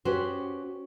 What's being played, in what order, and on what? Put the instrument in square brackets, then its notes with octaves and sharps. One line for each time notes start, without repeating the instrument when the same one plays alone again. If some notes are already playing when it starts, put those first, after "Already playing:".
[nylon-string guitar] C#4 F#4 G4 B4 C5